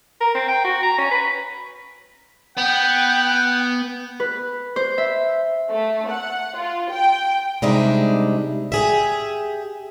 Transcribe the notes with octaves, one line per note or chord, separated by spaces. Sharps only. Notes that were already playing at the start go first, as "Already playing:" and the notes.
A#4
C4
G5
F#4
A#5
C#4
B4
B3 G5
B4
C5
E5
A3
F#5
F4
G5
C3 G3 G#3 D4 D#4 E5
G4 G#4 E5